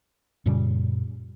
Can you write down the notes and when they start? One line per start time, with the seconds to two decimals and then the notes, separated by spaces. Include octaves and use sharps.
0.46 F#2 A#2 C#3 G3